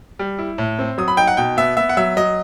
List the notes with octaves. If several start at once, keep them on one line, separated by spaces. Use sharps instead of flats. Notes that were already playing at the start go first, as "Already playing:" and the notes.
G3
E4
A2
C4
F#3 D#6
B5
D#4 G5
F#5
B2 G5
B3 E5
B3 E5
F#5
F#3 E5
F#3 D#5